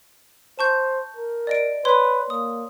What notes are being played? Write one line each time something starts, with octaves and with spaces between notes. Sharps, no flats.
C5 A5 C#6 G6
A#4
D5 D#5 D7
B4 C#5 C6
A#3 D#6